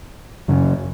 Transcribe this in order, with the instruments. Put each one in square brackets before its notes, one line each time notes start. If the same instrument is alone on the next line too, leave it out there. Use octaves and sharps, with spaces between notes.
[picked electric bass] F#2 C#3 F#3 C#4